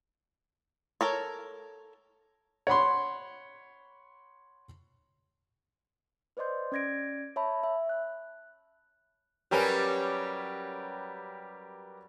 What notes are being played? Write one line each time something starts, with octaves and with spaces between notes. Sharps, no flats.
A4 A#4 C#5
C#5 F#5 B5 C6
B4 C5 D5 D#5 C6 G6
C#4 D5 G#6 A#6 D7
C#5 E5 A5 B5
E5
F#6
F#3 G3 C#4 G4 A#4 B4